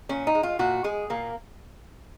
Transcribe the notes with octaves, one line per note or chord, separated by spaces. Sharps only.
A#2 C#4
D#4
G#3
F4
A#2 F#4
G#3 G#4
A#2 A#3